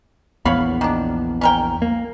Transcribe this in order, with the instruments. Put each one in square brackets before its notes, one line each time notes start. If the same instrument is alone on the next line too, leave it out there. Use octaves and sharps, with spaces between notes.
[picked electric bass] A#1 E2 B3 [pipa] C#5 F5 B5
[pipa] D#3 D4
C#4 A#4 G5
[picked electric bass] A#3